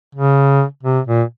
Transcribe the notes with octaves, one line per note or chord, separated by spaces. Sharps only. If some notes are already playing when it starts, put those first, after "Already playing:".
C#3
C3
A#2